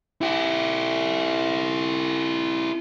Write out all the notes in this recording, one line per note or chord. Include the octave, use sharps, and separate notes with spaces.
E4 G4